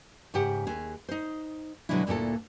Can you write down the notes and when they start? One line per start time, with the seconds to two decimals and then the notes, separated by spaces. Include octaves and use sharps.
0.34 G#2 C#3 G4 F#5
0.67 D#2 G#4
1.09 D#4 C5
1.89 B2 D3 F#3 G#3 D4 E4
2.07 D2 A#2 A#3 E4 A4